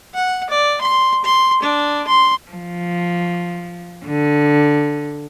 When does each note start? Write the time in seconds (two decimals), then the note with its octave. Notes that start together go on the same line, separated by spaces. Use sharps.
0.14 F#5
0.50 D5
0.81 C6
1.25 C6
1.63 D4
2.07 C6
2.51 F3
4.06 D3